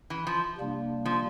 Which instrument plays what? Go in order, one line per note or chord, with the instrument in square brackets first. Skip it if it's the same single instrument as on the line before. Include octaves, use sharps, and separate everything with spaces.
[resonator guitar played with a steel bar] E3
F3
[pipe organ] C3 G3 A#3 D4
[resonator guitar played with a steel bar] F3